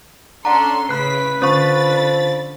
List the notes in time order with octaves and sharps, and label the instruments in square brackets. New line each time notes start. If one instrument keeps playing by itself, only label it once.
[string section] C#4 A4 C6 [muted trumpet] D4 [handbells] F#5 A#5
[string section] A2 C#3 B6 [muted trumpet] B4 [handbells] B5 F#6 C7
[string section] D3 B5 A6 [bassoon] F3 [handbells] C#4 C#6